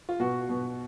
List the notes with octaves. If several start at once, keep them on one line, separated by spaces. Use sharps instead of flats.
F4
B2 F#4
B2